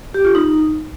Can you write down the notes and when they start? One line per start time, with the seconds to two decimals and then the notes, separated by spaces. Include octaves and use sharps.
0.14 G4
0.25 F4
0.35 D#4